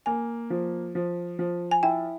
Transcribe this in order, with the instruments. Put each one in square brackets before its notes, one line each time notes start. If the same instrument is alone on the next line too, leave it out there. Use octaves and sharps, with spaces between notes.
[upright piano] A#3 [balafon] G#5
[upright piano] F3
F3
F3
[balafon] G#5
[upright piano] E4 [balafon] G5